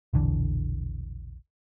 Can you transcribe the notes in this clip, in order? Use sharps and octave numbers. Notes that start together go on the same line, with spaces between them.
E1 A#1 D3 E3